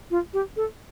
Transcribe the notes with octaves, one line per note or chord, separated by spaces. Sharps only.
F4
G4
A4